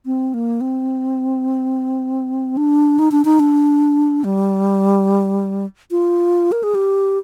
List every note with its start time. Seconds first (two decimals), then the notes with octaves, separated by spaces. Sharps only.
0.06 C4
0.34 A#3
0.61 C4
2.57 D4
2.99 D#4
3.12 D4
3.25 D#4
3.40 D4
4.24 G3
5.91 F4
6.52 A#4
6.63 G#4
6.75 G4